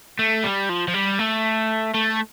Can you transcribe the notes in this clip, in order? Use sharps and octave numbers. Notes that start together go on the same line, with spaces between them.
A3
G3
F3
F3
G3
A3
A3